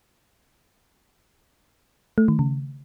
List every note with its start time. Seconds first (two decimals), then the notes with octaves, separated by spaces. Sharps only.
2.18 A3
2.28 D#3
2.39 C#3